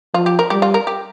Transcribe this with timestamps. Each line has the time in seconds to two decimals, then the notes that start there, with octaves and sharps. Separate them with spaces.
0.14 F3 F4
0.26 G4
0.39 A#4
0.50 G3 G4
0.62 F4
0.74 A#4
0.87 G4